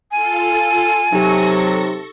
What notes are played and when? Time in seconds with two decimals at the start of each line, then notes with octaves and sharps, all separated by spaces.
0.12 F4 A4 G#5
1.12 C3 F#3 D#4 G4 A4 C#6 A#6